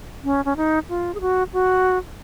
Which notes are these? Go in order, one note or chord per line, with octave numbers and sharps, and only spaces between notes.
C#4
C#4
D#4
F4
G#4
F#4
F#4